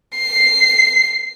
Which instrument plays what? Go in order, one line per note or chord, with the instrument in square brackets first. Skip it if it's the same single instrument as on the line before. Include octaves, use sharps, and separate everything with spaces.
[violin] C7